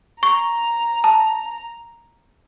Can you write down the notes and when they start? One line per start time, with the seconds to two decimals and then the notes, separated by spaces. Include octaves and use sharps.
0.23 A#5 C#6
1.04 A5